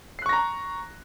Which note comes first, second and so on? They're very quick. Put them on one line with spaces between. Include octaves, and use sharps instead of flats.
C7 F#6 C#6 A#6 A#5